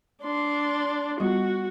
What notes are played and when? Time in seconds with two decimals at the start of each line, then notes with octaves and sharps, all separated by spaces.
0.23 D4 C6
1.20 G3 B3 F4 F#4